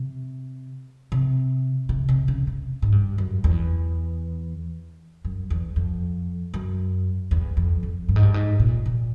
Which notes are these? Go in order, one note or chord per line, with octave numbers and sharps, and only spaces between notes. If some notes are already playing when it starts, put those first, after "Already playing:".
Already playing: C3
C3
C3
C3
C#3
C3
G#2
G2
F#2
E2
F#2
E2
F2
F#2
E2
F2
F2
G2
G#2
G2
G#2
A#2
A#2